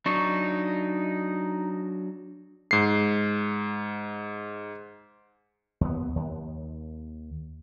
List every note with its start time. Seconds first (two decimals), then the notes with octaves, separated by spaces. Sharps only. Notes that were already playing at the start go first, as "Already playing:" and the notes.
0.06 F#3 D4 D#4 C#6
2.71 G#2 C7
5.81 D#2 B3
6.16 D#2